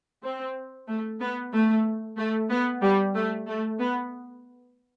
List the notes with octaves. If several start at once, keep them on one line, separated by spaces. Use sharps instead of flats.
C4
A3
B3
A3
A3
B3
G3
A3
A3
B3